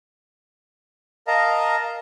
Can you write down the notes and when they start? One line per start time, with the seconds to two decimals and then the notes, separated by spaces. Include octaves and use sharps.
1.27 A#4 D#5 F5 A5 A#5